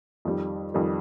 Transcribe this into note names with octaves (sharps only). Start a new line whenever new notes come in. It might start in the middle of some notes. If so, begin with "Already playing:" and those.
F2 D#3 G3
F2 D#3 G3